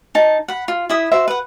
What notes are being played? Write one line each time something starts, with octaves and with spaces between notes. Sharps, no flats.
D#4 A5
F#5 B5
F4
E4 E5 D#6
F#4 C5 E5
B4 F#5